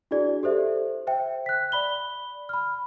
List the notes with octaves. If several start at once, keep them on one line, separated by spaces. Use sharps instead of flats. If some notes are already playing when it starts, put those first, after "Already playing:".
D4 E4 F#4 G#4 D5
G4 A4 C5 E5
C5 E5 G5
F#6 B6
D5 B5 G7
B5 F6